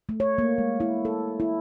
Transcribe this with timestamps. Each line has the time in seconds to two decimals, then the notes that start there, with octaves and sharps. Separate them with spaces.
0.09 A3
0.20 C#5
0.38 A#3
0.58 G#3
0.80 E4
1.05 A4
1.40 E4